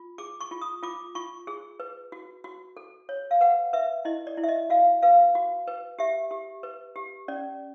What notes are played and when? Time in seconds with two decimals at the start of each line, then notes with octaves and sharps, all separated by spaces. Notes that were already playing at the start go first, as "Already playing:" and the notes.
Already playing: F4
0.18 G#4 D6
0.41 C#6
0.51 F4
0.61 D#6
0.83 F4 D6
1.15 F4 C#6
1.47 G#4
1.80 B4
2.12 F#4
2.44 F#4
2.77 A4
3.09 C#5
3.31 F5
3.41 B4 F#5
3.73 B4 E5
4.05 E4 D#5
4.27 D5
4.37 E4
4.44 E5
4.48 D#5
4.70 F#4 F5
5.03 B4 F5
5.35 F#4
5.67 B4
5.99 G4 E5
6.31 G4
6.63 B4
6.96 G4
7.28 C#4 D5